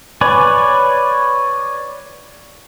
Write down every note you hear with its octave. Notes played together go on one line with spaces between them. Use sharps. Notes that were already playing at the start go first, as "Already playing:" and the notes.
B4 C#5 D5 G#5